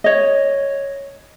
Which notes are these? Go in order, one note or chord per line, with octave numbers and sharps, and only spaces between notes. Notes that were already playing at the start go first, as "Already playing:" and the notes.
C#5 D#5